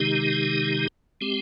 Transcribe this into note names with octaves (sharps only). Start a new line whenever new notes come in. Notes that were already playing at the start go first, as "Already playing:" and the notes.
Already playing: C3 D#3 G#3 D#4 G4
G#3 C4 G4